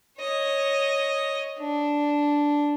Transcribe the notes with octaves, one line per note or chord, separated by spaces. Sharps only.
C#5 D#5
D4